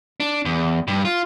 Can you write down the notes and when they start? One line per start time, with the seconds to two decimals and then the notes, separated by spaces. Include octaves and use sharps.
0.20 D4
0.45 E2
0.88 G2
1.05 F4